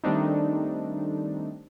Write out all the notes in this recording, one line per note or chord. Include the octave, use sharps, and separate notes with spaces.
D#3 G3 A3 C4 D4 D#4